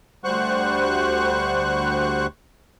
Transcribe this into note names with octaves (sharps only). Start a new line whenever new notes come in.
D2 G3 C5 F#5 C#6 F#6